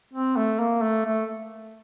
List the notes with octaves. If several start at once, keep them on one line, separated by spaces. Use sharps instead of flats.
C4
A3
A#3
A3
A3